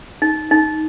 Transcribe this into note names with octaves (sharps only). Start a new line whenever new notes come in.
D#4
D#4